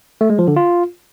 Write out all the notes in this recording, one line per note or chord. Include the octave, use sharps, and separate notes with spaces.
A3
G#3
F3
D3
F4